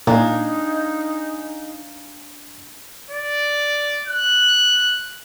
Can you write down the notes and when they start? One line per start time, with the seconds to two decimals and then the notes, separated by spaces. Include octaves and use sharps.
0.07 A#2 D4 D#4 F5 G#5 A#5
3.11 D5
4.07 F#6